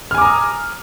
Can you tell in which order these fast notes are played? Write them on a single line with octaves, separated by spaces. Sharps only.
F6 G#5 D6 A#5 D#6